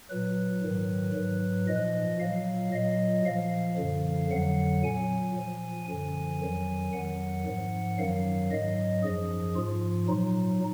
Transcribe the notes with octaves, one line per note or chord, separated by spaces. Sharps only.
A#2 F#3 B4
G#2 D#3 F#3
G#2 F#3
A#2 F3 D#5
A#2 F#3 F5
A#2 F#3 D#5
A#2 F3 F5
F#2 D3 F3
F2 D3 F#3 F#5
A#2 F#3 G#5
A#2 F3
F#2 D3 F3 G#5
F2 D#3 F#3
F2 D#3 F#3 F#5
G#2 F3
F#2 D#3 F#3 F5
G#2 F#3 D#5
F#2 F3 G#4
G#2 F3 F4
A#2 F#3 D#4